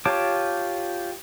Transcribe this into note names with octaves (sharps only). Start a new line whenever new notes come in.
F4 G4 C#5 A5 D6